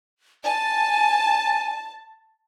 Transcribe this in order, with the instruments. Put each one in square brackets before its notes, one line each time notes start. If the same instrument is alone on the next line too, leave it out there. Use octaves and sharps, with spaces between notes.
[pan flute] G#5 [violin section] A5